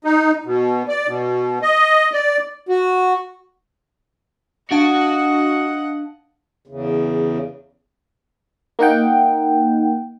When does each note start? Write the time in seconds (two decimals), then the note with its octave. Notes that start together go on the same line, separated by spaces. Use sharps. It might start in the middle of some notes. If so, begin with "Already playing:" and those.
0.04 D#4
0.46 B2
0.88 D5
1.07 B2
1.62 D#5
2.13 D5
2.69 F#4
4.71 D4 F#4 D#5 F5 F#5 A5
6.67 E2 C#3
8.79 A#3 D#4 F#5 G5